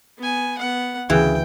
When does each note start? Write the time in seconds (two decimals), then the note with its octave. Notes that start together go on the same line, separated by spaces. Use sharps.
0.18 B3 G#5
0.57 B3 F#5
1.10 D2 C#3 E3 G5